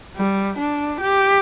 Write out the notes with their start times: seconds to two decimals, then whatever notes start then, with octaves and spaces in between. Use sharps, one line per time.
0.17 G3
0.58 D4
1.01 G4